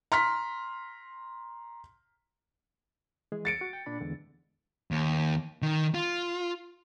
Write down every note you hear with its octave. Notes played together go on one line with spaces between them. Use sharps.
A#5 C6 F6 B6
E3 G#3 G#4
A6 C#7 D7
F#4
G5
A#2 D4 B5
E2 D3 G#3
D#2
D#3
F4